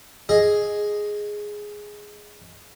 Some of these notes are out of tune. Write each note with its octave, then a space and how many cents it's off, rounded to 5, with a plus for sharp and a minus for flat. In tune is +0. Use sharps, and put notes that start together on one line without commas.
G#4 +0 D#5 +0